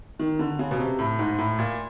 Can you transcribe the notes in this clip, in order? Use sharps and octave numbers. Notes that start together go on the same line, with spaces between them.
D#3
D3
C#3
B2
C3
A2
G#2
A2
A#2